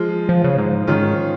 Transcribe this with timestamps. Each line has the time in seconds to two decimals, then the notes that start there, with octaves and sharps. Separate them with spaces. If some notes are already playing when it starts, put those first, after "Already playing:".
Already playing: F3 G#3 F4
0.29 F3
0.44 C#3
0.58 G#2
0.87 G#2 D#3 C#4 F4